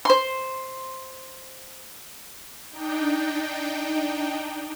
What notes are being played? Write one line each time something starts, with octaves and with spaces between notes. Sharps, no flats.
C5 C6
D4 D#4 G5